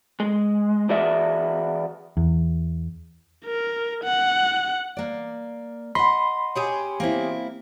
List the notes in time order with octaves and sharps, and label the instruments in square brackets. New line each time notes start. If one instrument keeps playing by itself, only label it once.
[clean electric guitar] G#3
E3 F#4 G#4 D5 E5
[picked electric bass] E2
[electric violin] A#4
F#5
[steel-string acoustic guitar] A#3 D5
[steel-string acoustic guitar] D#5 F#5 [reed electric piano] B5 C6
[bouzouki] C#4 G4 G#4
[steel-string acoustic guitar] A#3 C4 E4